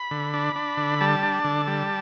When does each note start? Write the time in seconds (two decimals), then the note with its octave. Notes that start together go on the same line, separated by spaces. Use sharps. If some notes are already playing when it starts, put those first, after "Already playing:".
Already playing: B5
0.11 D3
0.34 D4
0.56 D4
0.77 D3
1.01 G3 A5
1.23 D4
1.44 D3
1.68 G3